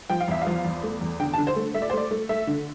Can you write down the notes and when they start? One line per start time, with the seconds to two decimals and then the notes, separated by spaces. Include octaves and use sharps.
0.10 F3 G5
0.20 F5
0.28 E2 E5
0.42 F3 F5
0.65 E2
0.83 A3
1.01 E2
1.20 D3 G5
1.34 A5
1.38 D3
1.47 C5
1.56 A3
1.74 A3 E5
1.82 D5
1.90 C5
1.93 A3 D5
2.11 A3
2.29 A3 E5
2.47 D3